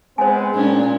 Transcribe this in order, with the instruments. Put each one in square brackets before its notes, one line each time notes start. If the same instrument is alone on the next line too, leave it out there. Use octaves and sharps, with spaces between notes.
[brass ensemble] G#3 B3 C4 [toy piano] C5 G#5
[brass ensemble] A#2 [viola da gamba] G#3 C#4 D4